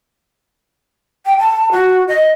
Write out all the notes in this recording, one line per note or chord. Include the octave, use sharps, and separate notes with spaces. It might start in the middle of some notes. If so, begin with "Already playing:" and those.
G5
A5
F#4
D#5